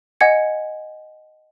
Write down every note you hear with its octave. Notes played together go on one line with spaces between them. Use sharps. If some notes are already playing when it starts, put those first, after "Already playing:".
D#5 F#5 G#5 G#6 C#7